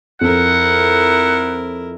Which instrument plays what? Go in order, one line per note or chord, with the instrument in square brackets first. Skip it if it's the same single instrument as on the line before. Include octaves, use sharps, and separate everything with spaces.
[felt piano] F2 [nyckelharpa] E4 A#4 [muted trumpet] F#5